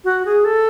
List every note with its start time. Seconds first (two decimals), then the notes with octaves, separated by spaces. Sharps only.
0.05 F#4
0.25 G#4
0.45 A4